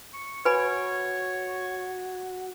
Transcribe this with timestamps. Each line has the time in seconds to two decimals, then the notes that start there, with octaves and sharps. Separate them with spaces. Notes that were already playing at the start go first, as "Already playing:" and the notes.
0.13 C#6
0.45 F#4 B4 C#5 G#5 B5